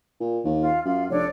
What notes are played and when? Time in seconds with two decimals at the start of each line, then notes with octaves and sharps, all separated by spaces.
0.20 A#2
0.44 D#2
0.61 F4
0.85 F#2 F4
1.09 F1 D4 A4 C#5